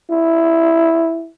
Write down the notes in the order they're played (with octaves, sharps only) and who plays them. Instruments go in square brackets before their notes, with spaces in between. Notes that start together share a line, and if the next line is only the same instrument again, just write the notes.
[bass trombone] E4